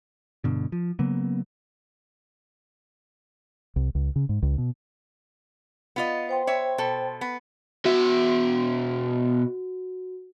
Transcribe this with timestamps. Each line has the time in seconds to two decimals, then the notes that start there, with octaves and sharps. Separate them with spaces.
0.44 G2 B2 D3
0.72 F3
0.99 C#3 F#3 A#3 B3
3.76 C2
3.95 C#2
4.16 C#3
4.29 G#2
4.42 C#2
4.58 B2
5.96 B3 F4 D#5
6.29 C5 G5 C6
6.47 C#5 E5
6.78 B2 A4
7.21 B3
7.85 B2 F#4 E5